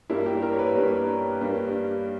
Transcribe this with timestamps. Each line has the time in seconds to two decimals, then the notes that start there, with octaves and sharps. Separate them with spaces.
0.10 G2 G3 A#3 E4
0.26 G4
0.42 A#4
0.52 C#5
0.59 B4
0.76 G2 G3 A#3
1.41 G2 G3 A#3